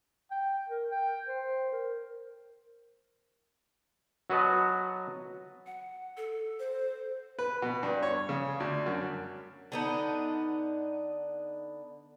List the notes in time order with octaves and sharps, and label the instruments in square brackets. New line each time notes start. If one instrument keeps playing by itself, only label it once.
[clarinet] G5
A#4
G5
C5
A#4
[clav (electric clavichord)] F#3 F#4 B4 D#5 A5
[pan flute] F#5
A4
[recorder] C5
[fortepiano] B4
B2
G2
C#5
C#3
D2
F#2
[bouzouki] D3 B3 D#4